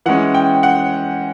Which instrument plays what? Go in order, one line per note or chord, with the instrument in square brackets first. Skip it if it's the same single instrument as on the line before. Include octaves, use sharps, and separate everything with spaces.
[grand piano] E3 G#3 C#4 F#5
G5
F#5